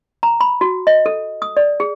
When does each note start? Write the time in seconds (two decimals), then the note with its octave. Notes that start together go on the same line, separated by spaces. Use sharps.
0.23 A#5
0.41 B5
0.61 F#4
0.87 D#5
1.06 A4
1.42 D#6
1.57 D5
1.80 G#4